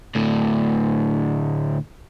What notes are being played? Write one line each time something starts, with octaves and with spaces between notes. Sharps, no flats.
D2 A2